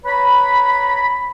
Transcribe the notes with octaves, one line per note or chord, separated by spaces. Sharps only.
B4 C#5 A#5 B5